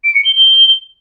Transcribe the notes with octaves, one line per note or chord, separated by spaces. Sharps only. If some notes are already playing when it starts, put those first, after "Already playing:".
D7
C#7
G7
G7